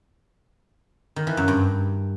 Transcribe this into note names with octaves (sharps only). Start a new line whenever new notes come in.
D#3
E3
F#2
G2